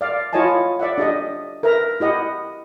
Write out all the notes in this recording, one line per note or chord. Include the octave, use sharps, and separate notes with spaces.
D5 F5
E4 F4 C#5 D#5 G#5 A5
D5 E5 F#5
D4 G4 D#5
A#4 B4 E5 A#5
E4 G4 D#5 F#5